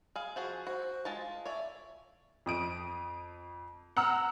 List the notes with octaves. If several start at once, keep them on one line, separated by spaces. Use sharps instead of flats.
G#4 F5
F3 F#4 G#4
F#4 C5
G#3 F4 A5
F5
C#5 D5 E5
F2 D#6 D7 D#7
F#5 A#5 E6 F6